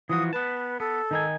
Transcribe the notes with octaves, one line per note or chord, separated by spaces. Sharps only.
E3 F3 F#4 D#6
B3 B4 A5
B3 A4
D#3 D#4 G#5